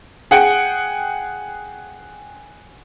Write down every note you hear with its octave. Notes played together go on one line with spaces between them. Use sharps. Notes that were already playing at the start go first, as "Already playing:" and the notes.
G#4 F#5 G5